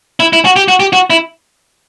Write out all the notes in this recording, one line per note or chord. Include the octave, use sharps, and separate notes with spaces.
E4
E4
F#4
G4
F#4
G4
F#4
E4